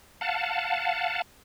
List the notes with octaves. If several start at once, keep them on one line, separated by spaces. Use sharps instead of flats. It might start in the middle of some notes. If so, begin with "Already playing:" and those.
F5 F#5 A5